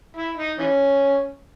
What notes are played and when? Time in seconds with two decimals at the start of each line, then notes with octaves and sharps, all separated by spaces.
0.16 E4
0.37 D#4
0.58 E3 C#4